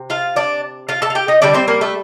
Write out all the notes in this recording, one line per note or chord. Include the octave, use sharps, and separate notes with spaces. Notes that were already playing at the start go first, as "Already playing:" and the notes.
Already playing: C3
F4 F5
D4 D5
F4 F5
A4 A5
F5
G4 G5
D#4 D#5
D3 G3 D4 D5
C4 C5
A#3 A#4
A3 A4